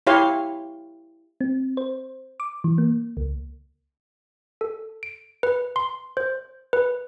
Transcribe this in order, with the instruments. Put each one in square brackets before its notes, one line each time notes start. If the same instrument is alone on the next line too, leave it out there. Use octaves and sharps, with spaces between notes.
[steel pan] E4 G4 C#5 F5 C6
[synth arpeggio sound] C4
C5
D6
E3
A#3
C#2
[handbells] A4
D7
B4
C6
C5
B4